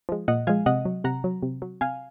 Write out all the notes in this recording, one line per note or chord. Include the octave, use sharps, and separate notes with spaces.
F3 G#3
A#2 D#5 F#5
F3 G#3 F5 G#5
C3 D#5 F#5
F#3
C3 F#5 A#5
F#3
C3
F#3
C3 F5 G#5